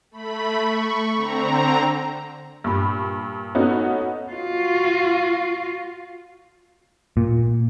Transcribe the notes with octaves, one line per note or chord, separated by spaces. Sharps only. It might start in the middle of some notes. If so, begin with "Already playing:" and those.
A3 B5
C#6
D3 C4 A#5
G2 A#2 B5
A3 B3 C#4 D#4 F#4
F4 F#4
A#2